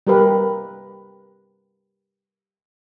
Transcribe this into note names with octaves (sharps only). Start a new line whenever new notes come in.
G3 G4 A#4 B4